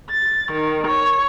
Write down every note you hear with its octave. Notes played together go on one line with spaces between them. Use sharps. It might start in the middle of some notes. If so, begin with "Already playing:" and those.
A6
D#3
C#5